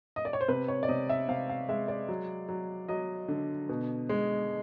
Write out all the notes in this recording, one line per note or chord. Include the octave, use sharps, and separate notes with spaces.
D#5
D5
C#5
C5
C3 B4
C#5
D5
C3 D#5
E5
C3 F5
F5
G#3 E5
D5
F#3
F#3
F#3 D#5
D3
B2
G#3